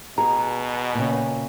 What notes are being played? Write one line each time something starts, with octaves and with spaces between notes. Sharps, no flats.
B2 G#4 A#5
A#2 C#3